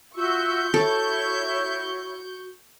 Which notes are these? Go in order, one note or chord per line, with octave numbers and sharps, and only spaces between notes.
F4 F#4 E5 C#6 E6 G6
E4 F#4 A4 C#5